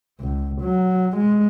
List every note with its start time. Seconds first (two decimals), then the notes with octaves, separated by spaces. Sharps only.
0.21 C#2
0.61 F#3
1.17 G#3